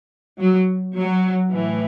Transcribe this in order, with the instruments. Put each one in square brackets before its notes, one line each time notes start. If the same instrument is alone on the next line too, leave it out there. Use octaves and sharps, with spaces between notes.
[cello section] F#3
F#3
A2 E3